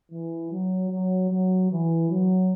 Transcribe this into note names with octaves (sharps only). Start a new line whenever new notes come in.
E3
F#3
F#3
F#3
E3
F#3